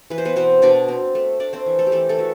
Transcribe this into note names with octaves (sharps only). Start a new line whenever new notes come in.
E3 B4
C5
B3 B4
B2 C4 C5
B2 D4 D5
C4
A3
A3 D4 D5
C4 C5
E3
A3 A4
G4
E3 A3 A4
A3 A4
E3 F#4